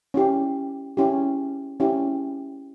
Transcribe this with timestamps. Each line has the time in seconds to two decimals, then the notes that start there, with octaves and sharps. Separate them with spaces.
0.14 C#4 E4 G4
0.97 C#4 E4 G4
1.80 C#4 E4 G4